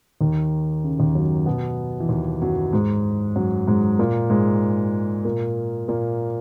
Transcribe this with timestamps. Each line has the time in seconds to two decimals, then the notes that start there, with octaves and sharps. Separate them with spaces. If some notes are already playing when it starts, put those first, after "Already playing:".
0.21 D#2 D#3
0.84 C#3
0.99 D#2 D#3
1.15 F#2 F#3
1.46 B2 B3
2.00 E3
2.09 D#2 D#3
2.42 F#2 F#3
2.73 G#2 G#3
3.36 F#2 F#3
3.67 G#2 G#3
3.99 A#2 A#3
4.30 G#2 G#3
5.25 A#2 A#3
5.88 A#2 A#3